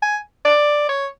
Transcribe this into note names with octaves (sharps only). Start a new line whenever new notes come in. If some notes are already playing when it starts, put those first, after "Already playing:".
G#5
D5
C#5